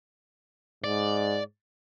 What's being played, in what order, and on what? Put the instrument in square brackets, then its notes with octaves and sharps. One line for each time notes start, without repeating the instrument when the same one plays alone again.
[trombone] G#2 [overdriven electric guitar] D5